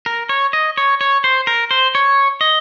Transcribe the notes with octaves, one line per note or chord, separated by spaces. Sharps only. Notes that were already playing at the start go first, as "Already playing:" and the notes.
A#4
C#5
D#5
C#5
C#5
C5
A#4
C5
C#5
D#5